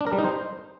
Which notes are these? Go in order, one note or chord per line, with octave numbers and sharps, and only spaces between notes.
D4
A#4
G3
D#4
C5